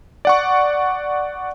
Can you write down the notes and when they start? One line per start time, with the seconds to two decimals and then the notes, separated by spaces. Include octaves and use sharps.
0.25 D5 F#5 C#6